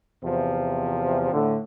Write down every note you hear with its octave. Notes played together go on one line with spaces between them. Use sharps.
E2 C3 F3
A2 D3